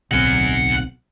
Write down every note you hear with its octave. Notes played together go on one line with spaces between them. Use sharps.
D1 B1 C4 F#5 G#5